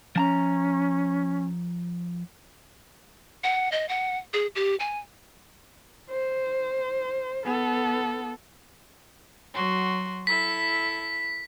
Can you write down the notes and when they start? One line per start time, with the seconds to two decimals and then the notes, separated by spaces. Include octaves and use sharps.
0.16 F3 C#4 A5 A#5
3.44 F#5
3.72 D#5
3.89 F#5
4.33 G#4
4.56 G4
4.80 G#5
6.10 C5
7.45 B3 A4
9.53 F#3 F#4 C6
10.27 E4 A4 B6